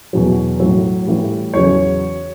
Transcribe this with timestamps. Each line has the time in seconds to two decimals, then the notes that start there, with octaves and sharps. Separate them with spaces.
0.13 E2 B2 F#3
0.60 A2 F#3
1.07 A2 E3 G3
1.54 E2 C#3 F#3 C#5